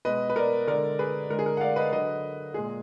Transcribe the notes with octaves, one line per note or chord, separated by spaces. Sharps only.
B2 G#3 B4 D#5
B4
A#4 D5
D3 G#3 A#4 D5
G#4 B4
D3 G#3 A#4
G#4
A#4
F#5
D5 F5
B4 D#5
D3 F#3 B4 D#5
A#2 G#3 G#4